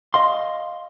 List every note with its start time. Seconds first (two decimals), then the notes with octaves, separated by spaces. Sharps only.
0.14 D#5 F5 C6